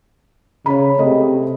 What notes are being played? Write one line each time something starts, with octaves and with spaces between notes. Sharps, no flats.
C#3 C#5 B5
C3 A3 G#4 D#5